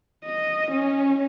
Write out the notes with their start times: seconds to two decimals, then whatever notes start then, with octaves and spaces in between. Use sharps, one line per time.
0.25 D#5
0.71 C#4